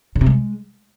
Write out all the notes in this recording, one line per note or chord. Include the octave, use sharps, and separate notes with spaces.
C#3
C3
G#3